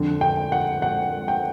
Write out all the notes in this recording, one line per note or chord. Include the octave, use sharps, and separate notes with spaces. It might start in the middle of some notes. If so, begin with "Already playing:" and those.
Already playing: F2 D3
G5
F#5
F#5
G5